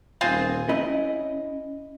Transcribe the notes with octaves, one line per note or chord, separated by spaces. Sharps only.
D#1 C4 F4 G#4
C#4 E4 D#5